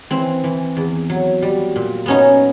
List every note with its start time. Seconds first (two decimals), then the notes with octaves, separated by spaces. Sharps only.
0.11 E3 C4
0.44 E3
0.77 E2
1.10 F#3
1.42 G3
1.76 A#2
2.06 B3 C#4 D#4